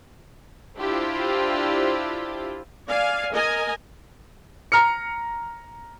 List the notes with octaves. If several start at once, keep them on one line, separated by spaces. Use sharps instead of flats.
D4 E4 F4 G4 C5
D5 F5 G#5
A#4 D#5 G#5
A#5 F6 C#7